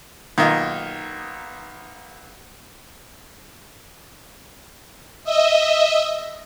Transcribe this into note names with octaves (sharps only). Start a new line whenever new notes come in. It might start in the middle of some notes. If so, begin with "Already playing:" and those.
B1 D#3 A#3 F4 D#5
D#5 E5